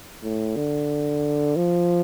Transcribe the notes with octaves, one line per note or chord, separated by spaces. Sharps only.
A2
D3
F3